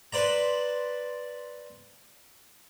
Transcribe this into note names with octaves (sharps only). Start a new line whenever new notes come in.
B4 C5 D5 A#5